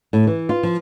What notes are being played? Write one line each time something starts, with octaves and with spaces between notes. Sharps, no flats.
A2
E3
F4
F3